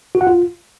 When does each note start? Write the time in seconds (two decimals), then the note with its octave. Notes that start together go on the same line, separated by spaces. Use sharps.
0.15 F#4
0.21 F#5
0.27 F4